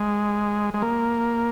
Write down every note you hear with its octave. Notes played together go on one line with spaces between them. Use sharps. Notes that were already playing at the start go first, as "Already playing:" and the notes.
Already playing: G#3
G#3
A#3